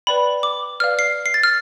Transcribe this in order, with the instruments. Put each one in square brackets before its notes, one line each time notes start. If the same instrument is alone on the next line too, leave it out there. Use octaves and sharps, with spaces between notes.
[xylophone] B4 D5 G5 B5
D6
B4 D5 F5 F6
C7
C7
A6
F6